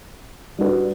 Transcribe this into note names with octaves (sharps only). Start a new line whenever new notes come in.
G3 D4 F#4 B4